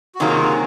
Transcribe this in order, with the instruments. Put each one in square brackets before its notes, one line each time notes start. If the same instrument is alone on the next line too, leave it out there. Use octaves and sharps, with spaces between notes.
[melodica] F#4
[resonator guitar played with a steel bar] C3 D#3 F#3 A#3 [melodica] F4 G#4